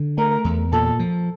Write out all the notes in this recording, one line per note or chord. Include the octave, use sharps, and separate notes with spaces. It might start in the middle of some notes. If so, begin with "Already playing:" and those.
Already playing: D3
A3 A#4
E2
A#2 A4
F3